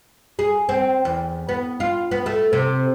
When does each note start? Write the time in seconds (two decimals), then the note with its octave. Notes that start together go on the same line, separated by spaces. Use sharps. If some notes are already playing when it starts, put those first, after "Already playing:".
0.39 G#4
0.69 C4
1.05 E2
1.49 B3
1.80 F4
2.11 B3
2.26 A3
2.53 C3